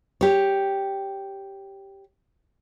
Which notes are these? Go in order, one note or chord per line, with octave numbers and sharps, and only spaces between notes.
G4 C#5